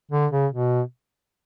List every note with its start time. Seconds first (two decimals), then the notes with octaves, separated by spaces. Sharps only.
0.11 D3
0.32 C#3
0.52 B2